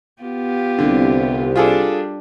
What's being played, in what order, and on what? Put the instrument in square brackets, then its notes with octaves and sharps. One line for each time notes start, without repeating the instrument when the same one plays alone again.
[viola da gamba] B3 F4 G4
[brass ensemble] C2 [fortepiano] D3
[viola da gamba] G3 D4 [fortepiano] F4 G#4 A4